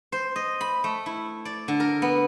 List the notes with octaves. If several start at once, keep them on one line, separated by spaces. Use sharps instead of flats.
C5
D#5
B5
A3
E4
D5
D3
A#4
B3